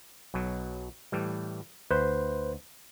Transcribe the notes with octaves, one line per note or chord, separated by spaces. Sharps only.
B1 B2 F#3
A2 E3 G3
D2 B4 C5